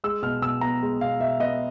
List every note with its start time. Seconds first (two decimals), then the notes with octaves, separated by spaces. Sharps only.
0.04 G#3 E6
0.22 B2 F6
0.42 B2 E6
0.61 B3 A#5
0.82 G#3
1.00 B2 F5
1.20 B2 E5
1.40 B3 D#5